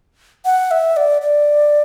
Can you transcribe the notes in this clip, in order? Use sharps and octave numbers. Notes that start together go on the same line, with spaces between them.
F#5
E5
D5
D5